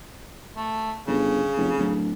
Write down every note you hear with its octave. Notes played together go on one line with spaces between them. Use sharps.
A3
G1 C#3
F1
D1